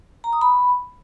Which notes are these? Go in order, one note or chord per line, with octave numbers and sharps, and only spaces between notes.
A#5
D#6
B5